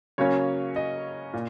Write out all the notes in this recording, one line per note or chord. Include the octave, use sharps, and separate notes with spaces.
C#3 F#3 A#3 C#4 C#5
D#5
A#2